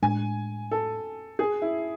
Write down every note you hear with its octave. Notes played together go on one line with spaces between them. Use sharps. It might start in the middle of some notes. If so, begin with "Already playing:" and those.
A2 G#3 D4 G#5
A4
G#4
E4